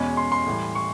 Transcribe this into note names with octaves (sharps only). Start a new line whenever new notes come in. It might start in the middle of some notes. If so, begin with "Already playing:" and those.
Already playing: E2 B2 G#3 C#4 B5
C6
C6
A2 E3 G3
C#6